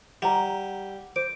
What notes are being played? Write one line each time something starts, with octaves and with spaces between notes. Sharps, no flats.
G3 F#5 A#5
C5 D6